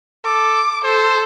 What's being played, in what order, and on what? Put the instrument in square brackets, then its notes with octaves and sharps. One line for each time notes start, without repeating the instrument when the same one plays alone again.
[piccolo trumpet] A4 [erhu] D6
[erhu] A4 [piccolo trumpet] C5